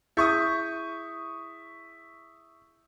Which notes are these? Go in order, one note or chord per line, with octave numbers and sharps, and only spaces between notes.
E4 G#4 E5 C#6 D#6 G6